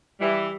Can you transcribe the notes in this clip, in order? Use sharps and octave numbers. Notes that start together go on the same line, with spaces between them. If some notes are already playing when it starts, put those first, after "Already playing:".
E3 G3